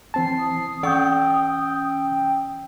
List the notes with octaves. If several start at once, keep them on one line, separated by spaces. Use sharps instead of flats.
E3 C4 A5 C7
D#6
E3 C#4 D5 G5 C#6 E6 G6